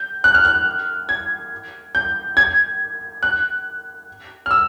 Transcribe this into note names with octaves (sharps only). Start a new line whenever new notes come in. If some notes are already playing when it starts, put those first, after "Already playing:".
Already playing: G6
F#6
F6
F#6
G#6
G6
G#6
F#6
F6
E6